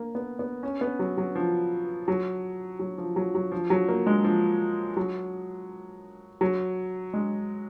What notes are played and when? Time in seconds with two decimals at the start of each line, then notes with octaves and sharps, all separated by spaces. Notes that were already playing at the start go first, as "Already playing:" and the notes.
Already playing: A#3
0.15 B3
0.39 B3
0.63 C#4
0.81 B3
0.99 F#3
1.18 F#3
1.35 F3
2.08 F#3
2.79 F#3
2.98 F3
3.16 F#3
3.35 F#3
3.52 F3
3.70 F#3
3.88 A#3
4.07 G#3
4.24 F3
4.97 F#3
6.41 F#3
7.13 G#3